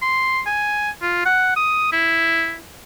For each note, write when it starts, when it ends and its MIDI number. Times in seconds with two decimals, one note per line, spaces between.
0.02 0.41 84
0.46 0.90 80
1.02 1.22 65
1.26 1.52 78
1.56 1.90 87
1.92 2.56 64